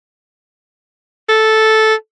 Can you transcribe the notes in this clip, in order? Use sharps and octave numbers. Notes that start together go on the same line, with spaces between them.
A4